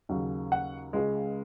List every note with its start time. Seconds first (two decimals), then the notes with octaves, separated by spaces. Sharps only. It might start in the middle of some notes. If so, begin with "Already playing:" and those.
0.09 D#2 C#3 F#3
0.52 F#5
0.93 C#2 C#3 G#3